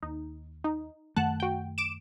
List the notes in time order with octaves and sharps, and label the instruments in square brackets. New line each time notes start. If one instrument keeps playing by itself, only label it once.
[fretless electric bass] D#2 [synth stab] D#4
[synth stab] D#4
[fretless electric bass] F#2 D#3 A3 [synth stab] F#5 A5 F#6
[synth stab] F#4 G5
D6 D7 E7